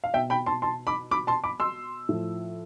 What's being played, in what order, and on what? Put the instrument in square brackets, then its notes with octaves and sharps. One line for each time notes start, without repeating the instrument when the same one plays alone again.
[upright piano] F5
B2 E5 G5
G5 B5
A5 C6
A5 C6
B5 D6
B5 D6
A5 C6
B5 D6
C6 E6
A2 F3